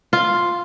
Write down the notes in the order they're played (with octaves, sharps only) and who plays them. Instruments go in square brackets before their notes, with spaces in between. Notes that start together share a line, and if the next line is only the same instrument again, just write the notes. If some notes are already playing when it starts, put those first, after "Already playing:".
[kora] F4